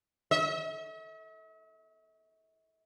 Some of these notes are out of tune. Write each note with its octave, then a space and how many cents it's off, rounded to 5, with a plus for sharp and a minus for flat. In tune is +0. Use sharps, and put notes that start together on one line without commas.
E5 -45